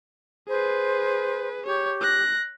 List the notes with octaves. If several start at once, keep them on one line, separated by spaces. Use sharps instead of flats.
G#4 B4 C5
G4 C#5
F#6 A#6